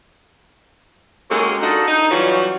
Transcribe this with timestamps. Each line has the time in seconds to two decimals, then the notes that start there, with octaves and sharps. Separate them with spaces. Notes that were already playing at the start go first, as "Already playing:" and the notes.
1.31 G#3 A#3 C#4 F#4 G4 A4
1.62 D4 D#4 F4 F#4 A4 D#5
1.87 D#4
2.11 E3 F#3 G3 C#4 F4 F#4